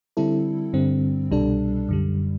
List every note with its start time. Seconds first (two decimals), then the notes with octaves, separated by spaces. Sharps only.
0.17 D3 G3 C4 E4 A4
0.73 G2 D3 G3 C4
1.31 C2 B2 G3 D4 A4
1.89 F#2 D3 G3